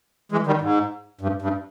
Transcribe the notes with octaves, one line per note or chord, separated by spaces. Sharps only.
E3 G#3
D#3 G3
G#2
G2
G2